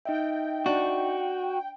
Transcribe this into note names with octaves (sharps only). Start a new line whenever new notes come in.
D#4 D#5 E5 G5
D4 F#4